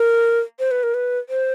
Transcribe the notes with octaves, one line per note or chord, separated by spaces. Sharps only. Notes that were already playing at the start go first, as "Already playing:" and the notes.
Already playing: A#4
C5
B4
A#4
B4
C5